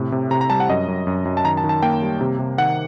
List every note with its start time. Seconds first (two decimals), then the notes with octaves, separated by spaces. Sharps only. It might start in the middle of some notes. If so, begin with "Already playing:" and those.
Already playing: A2 C3
0.12 C3
0.31 C3 A#5
0.41 A#5
0.50 G3 A5
0.60 F#5
0.69 F#2 D#5
0.88 F#2
1.07 F#2
1.25 F#2
1.37 A5
1.44 D#3 A#5
1.57 A5
1.64 D#3
1.69 A5
1.82 A#3 G5
2.02 G3
2.21 C3
2.39 C3
2.58 D#3 F#5